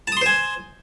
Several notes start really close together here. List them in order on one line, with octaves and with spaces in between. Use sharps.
A5 D#6 C6 C5 G#5